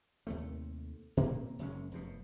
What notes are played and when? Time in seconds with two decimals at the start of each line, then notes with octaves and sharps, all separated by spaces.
0.27 D#2 C3 A3
1.17 A#2 A#3 C4
1.59 F#1 F#2 G#3 C#4
1.91 F1 F#2 B2